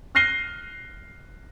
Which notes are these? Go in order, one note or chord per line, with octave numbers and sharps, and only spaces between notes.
F6 F#6 A#6 C7 D#7 G7